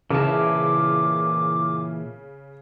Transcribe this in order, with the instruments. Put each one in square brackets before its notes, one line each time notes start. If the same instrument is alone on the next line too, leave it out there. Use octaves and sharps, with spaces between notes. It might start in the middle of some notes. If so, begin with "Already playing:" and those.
[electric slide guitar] A#2 A5 [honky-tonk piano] C#3 [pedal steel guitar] E3 E4 A#4 [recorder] D6